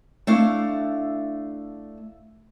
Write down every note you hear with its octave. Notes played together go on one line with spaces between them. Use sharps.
A3 D4 E4 F5